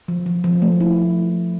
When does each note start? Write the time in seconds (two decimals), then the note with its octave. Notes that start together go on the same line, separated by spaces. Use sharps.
0.08 F3
0.26 F3
0.44 F3
0.62 A3
0.81 E4